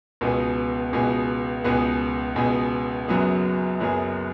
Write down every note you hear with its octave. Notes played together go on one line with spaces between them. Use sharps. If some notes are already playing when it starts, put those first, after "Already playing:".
C#2 B2 B3 G#4
C#2 B2 B3 G#4
C#2 B2 B3 G#4
C#2 B2 B3 G#4
F#1 F#2 F#3 B3 G#4
F#1 F#2 F#3 B3 G#4